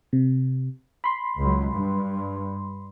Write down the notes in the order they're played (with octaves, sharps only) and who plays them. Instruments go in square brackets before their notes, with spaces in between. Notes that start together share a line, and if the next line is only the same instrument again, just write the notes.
[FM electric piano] C3
B5 C6
[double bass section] C#2 F#3
G2